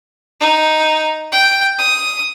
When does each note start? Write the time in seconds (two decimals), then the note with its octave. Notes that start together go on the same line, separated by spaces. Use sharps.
0.41 D#4
1.32 G5
1.79 D#6